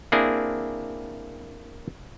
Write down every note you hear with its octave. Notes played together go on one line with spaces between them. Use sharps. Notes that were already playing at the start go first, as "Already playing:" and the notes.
A#3 C4 D4 E4 G#4